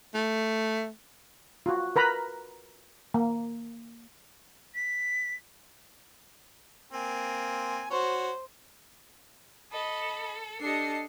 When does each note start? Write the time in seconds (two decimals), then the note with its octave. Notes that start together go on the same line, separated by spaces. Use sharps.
0.14 A3
1.66 F4 F#4
1.96 A#4 B4 A#5 B5
3.14 A#3
4.75 B6
6.93 A#3 C4 G#5
7.91 F#4 C5 C#5
9.72 A4 D#5 B5
10.61 D4 G4 A4 D#5 A5 C7 C#7